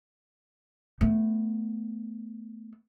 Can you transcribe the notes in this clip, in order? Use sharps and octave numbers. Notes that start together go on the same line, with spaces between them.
A3 B3